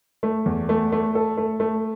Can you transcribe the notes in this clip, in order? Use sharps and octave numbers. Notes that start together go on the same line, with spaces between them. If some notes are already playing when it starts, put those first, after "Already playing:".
A3
E2
A3
A3
A4
A3
A3